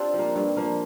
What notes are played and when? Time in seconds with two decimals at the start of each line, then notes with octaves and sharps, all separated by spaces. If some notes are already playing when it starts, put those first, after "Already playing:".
Already playing: C4 D4 F4 G4
0.14 F3 A#3
0.36 G2
0.57 F3 A#3